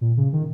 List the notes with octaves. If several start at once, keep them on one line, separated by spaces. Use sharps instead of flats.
A#2
C#3
D#3